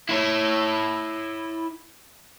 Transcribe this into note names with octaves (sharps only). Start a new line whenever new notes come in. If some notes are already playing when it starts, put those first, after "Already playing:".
E4 C#5